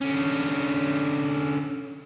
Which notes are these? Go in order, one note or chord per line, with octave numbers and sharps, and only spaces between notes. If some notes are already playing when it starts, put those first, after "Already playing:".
D3 C#4